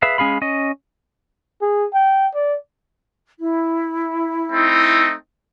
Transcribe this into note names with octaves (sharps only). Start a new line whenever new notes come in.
G#4 B4 E5 F5
G#3 C#4 G#4 F5 B5
C#4 D#5
G#4
G5
D5
E4
A3 C4 D#4